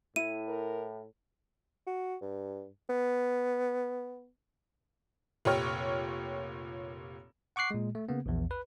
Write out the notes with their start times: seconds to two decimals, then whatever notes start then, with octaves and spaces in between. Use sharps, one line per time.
0.16 A2 E4 D#7
0.49 A#4
1.87 F#4
2.21 G2
2.89 B3
5.45 F1 A#2 G4 C#5 F6
7.56 F#5 C#6 D6 F#6 C7
7.71 A#2 G#3
7.95 A3
8.09 C#3 A#3 B3
8.26 A#1 E2
8.51 B4